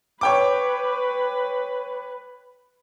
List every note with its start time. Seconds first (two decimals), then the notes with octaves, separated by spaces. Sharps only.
0.21 B4 C#5 G5 D6